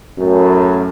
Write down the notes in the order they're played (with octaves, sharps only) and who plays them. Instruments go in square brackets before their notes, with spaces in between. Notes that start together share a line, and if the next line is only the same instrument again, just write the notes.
[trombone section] F#2 A2